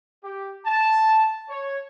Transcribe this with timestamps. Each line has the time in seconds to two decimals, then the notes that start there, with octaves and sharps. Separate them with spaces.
0.24 G4
0.66 A5
1.50 C#5